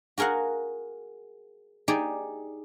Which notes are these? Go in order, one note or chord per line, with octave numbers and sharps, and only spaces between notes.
F#4 G#4 A#4 F5 F#5
D#4 G4 G#4 D5